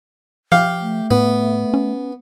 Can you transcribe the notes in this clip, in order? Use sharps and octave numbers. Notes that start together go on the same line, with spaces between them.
F3 G4 F5
A3
A2 B3
C#4